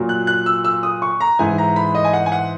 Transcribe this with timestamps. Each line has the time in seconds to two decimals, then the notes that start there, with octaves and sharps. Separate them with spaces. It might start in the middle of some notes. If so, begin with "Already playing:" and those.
Already playing: A#2 F#3
0.09 F#6
0.27 F#6
0.46 E6
0.65 E6
0.83 D#6
1.02 C#6
1.20 A#5
1.39 G#2 E3 G#5
1.58 A#5
1.76 B5
1.95 D#5
2.05 G#5
2.13 F#5
2.26 G#5
2.32 F#5